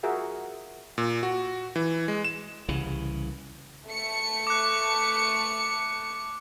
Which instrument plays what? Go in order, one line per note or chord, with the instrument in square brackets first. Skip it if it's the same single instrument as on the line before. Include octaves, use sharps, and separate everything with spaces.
[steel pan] F4 F#4 G#4 A#4 E5 F#5
[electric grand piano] A#2
F#4
E3
G#3
E7
[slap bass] C2 C#3 E3
[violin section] A3 C#7
[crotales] D6 F#6